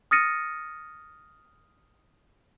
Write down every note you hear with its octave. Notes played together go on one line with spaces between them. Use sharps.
D#6 F6 A6 A#6 C#7 D#7